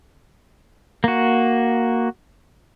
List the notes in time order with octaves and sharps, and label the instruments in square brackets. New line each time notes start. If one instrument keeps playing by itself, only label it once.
[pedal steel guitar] A#3 F#4